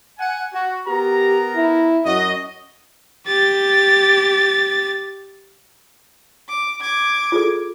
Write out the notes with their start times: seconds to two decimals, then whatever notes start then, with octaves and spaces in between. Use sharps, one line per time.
0.19 F#5 G#5
0.54 F#4
0.87 B3 G4 A#4 A#5
1.56 E4
2.05 F#2 F#4 D#5
3.27 G4 A6
6.49 D6
6.81 D6 G#6
7.32 F4 G#4 A4